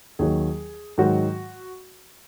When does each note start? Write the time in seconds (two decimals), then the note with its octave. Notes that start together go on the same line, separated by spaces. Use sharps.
0.19 D#2 D#3 F#3 G#4
0.98 G#2 D#3 F#3 F#4